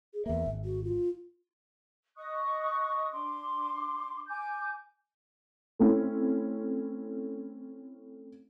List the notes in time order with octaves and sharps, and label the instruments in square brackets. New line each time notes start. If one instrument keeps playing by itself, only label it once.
[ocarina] G#4
[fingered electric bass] E2 A#3 [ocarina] E5
[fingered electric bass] G#1
[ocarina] F#4
F4
[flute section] D#5 C#6 D#6 F#6
D4 C6 D6
G#5 D6 G6
[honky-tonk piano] A3 C4 C#4 E4